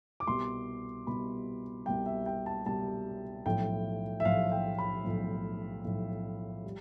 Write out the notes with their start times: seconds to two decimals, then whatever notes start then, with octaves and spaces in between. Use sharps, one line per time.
0.20 D6
0.27 C2 B2 G3 C6
1.07 C2 B2 G3 B5
1.86 C2 B2 G3 G5
2.06 E5
2.26 G5
2.46 A5
2.66 C2 B2 G3 A5
3.46 B1 A2 F3 G5
4.20 E5
4.25 B1 A2 F3 F5
4.52 G5
4.78 B5
5.05 B1 A2 F3
5.85 B1 A2 F3
6.64 G3